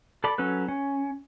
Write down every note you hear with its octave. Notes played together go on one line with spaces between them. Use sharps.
A4 D5 B5 D6
F#3 C#4 A4 B4
C#4